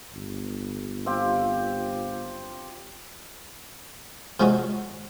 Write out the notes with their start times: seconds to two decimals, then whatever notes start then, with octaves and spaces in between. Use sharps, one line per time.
0.13 G1
1.06 C4 F4 G4
4.40 C3 F3 G#3 C#4 D#4 F#4